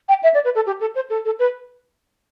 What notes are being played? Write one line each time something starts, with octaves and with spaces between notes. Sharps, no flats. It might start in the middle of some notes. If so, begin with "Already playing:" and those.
G5
E5
D5
B4
A4
G4
A4
C5
A4
A4
B4